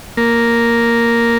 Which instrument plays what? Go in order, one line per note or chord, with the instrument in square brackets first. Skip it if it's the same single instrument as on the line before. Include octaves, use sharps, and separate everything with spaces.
[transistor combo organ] A#3